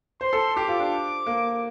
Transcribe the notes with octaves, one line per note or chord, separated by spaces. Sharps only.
C5 C6
A4
G4 D6
F4
D4
A#3